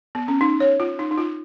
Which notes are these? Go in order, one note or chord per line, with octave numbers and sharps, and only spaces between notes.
B3
C#4
D#4
C#5
F4
D#4
D#4
F4